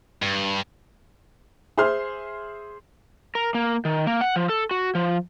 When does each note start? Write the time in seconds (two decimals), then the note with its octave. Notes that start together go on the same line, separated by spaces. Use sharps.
0.22 G2
1.78 G#4 C5 E5 C6 F6
3.35 A#4
3.55 A#3
3.85 D#3
4.07 A#3
4.21 F#5
4.36 F3
4.49 A4
4.71 F#4
4.95 F3